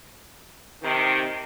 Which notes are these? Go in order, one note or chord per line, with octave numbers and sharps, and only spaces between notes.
C3 D#3